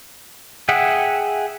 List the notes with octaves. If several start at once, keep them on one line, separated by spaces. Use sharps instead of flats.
G#4 E5 F#5 G5